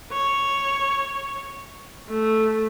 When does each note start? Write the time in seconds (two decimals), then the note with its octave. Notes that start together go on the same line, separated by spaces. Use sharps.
0.12 C#5
2.09 A3